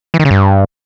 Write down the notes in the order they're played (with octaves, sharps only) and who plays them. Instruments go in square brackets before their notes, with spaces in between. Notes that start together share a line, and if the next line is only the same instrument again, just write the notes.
[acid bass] E3
D#3
C#3
G2